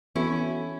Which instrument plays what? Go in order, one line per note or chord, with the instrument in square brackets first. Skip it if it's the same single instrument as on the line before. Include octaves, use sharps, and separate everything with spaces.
[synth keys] E3 B3 F#4 A4 [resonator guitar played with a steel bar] C#4 E4